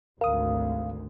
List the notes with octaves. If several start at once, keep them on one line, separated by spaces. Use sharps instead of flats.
G#1 D2 A#4 F5 D#6